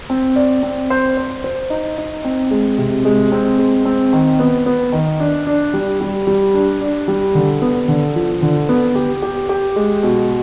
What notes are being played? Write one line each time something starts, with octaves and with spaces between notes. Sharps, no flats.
C4
D5
C4
C5
C5
C5
D#4
D#4
C4
G#3
C3
G#3
C4
G#3
C4
D#3
B3
B3
D#3
D4
D4
G3
G3
G3
D4
D4
G3
D3
B3
D3
F3
D3
B3
G4
G4
G4
G#3
B2